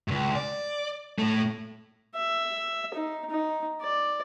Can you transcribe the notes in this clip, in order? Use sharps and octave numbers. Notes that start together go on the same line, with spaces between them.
C#2 G2
D5
A2 A3
E5
D#4
D#4
D5